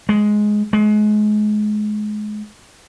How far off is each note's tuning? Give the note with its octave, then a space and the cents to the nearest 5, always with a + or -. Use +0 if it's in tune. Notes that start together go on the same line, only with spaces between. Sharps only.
G#3 +10
G#3 +30